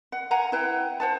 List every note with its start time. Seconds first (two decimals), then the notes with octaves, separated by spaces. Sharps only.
0.12 F#5
0.31 F5 F#5 G#5 A#5
0.52 E4 B4 G5
1.00 C5 F#5 A5